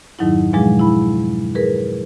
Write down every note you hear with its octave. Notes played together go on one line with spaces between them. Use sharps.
F2 G#2 D#3 F#3 D#4 E4
B2 F3 F#3 G#3 D4 G#4
E4 B5
G#4 A#4 B4